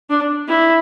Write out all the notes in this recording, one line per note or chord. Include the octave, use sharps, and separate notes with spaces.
D4
E4